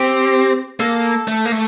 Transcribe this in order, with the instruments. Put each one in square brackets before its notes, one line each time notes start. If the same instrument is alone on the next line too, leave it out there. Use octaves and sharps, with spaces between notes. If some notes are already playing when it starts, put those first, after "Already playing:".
Already playing: [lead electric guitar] C4 [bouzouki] G4
[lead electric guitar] A#3 [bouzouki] A4
[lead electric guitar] A3
A#3
A3